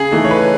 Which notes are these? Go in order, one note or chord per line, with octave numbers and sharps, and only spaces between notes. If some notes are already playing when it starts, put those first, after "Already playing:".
Already playing: C#3 G#4
E3 A3 D#4
C#5
B4